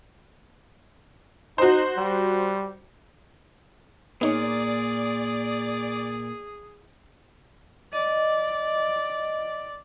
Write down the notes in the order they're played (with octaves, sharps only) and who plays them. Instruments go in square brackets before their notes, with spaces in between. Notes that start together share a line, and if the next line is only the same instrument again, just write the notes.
[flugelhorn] D#4 [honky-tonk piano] F#4 C5
[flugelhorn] G3
[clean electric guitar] A#2 [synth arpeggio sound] B3 D#4 C#5 [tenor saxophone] G#4 [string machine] D5
[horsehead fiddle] D5 [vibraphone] D#5